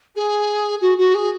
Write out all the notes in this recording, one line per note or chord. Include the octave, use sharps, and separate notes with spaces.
G#4
F#4
F#4
G#4